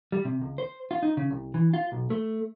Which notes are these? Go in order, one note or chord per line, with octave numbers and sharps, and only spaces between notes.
G3
C3
C#2
C5
F4
D#4
C#3
C2
E3
F4
B1
A3